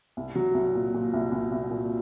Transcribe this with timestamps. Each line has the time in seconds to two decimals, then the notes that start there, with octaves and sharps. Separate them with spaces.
0.17 C2
0.35 F#3
0.55 C2
0.75 A#2
0.94 A#2
1.14 C2
1.32 C2
1.52 C2
1.71 A#2